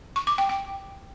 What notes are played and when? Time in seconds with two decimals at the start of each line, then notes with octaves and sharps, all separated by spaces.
0.16 C#6
0.27 D6
0.38 G5
0.49 G5